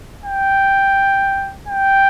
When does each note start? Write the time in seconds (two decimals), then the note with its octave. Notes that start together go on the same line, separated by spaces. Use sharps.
0.25 G5
1.68 G5